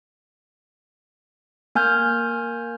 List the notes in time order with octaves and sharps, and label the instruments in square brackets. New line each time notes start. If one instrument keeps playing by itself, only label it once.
[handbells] A#3 G#5 F6 G6